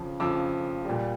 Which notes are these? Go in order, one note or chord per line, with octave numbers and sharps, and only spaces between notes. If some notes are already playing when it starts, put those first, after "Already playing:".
Already playing: F2 C#3 F3
F2 C#3 F3 D6 E6
A#2 G3